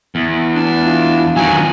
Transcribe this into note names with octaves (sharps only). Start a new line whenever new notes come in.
E2
D4
F4
D#3 F#3 G#5